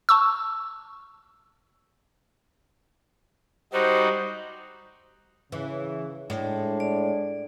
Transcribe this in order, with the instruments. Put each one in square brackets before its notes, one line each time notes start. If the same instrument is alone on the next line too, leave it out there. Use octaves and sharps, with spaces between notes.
[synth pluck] A5 C#6 E6
[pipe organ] G3 D#4 F#4 [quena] C5
[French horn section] C#3 [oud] E3
[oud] A2 [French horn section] G#3 D4
[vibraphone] D5